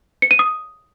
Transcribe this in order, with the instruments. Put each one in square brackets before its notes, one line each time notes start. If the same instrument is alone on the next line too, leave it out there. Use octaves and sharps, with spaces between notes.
[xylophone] C#7
D#7
D#6